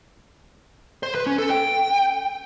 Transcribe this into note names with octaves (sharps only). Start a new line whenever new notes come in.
C5
B4
C#4
A4
G5